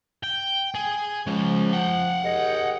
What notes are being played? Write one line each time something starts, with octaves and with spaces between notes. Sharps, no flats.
G5
G#4
F3 G#3 C#4
F#5 G5
D#2 G#4 D#5